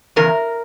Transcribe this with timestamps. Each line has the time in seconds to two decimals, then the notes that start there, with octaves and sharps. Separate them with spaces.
0.16 E2 C#3 A#4